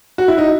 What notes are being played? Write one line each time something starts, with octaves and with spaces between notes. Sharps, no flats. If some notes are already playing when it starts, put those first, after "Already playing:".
F#4
E4
D#4